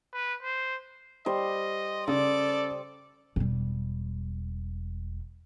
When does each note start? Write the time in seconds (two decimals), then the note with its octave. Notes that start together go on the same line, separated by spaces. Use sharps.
0.13 B4
0.43 C5
1.26 G3 C5 D#5
2.08 C#3 A4 D5 D#6
3.36 E1 G3